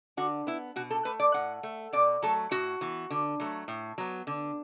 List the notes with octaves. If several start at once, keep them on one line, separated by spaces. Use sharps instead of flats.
D3 F#4
B3 E4
B2 F#4
A4
A3 B4
D5
A2 F#5
A3
B2 D5
F#3 A3 A4
A2 F#4
E3 B3
D3
F#3 A3
A2
F#3 B3
D3